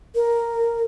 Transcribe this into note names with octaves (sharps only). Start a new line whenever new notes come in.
A#4